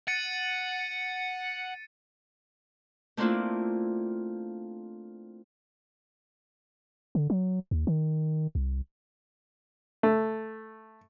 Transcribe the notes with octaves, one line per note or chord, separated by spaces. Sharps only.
F#5 A6 C#7 D#7
A3 A#3 C4 D4 E4 F4
D3
F#3
D#2
D#3
C2
A3